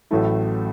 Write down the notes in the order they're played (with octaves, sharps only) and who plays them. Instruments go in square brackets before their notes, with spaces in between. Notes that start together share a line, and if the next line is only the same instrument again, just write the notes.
[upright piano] A1 A2 F#3 A3 E4